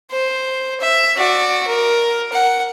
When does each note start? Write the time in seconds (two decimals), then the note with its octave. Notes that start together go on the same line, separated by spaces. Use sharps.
0.11 C5
0.81 E5
1.16 F#4 D5
1.68 A#4
2.33 F#5